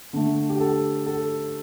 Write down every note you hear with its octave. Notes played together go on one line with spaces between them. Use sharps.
D3 A3
G4
A4
A4